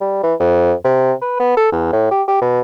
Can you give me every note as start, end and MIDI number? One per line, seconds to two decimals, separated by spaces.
0.01 0.22 55
0.23 0.34 52
0.40 0.73 41
0.84 1.13 48
1.22 1.38 71
1.39 1.57 59
1.57 1.68 69
1.72 1.90 40
1.92 2.09 45
2.11 2.23 67
2.28 2.41 67
2.42 2.62 47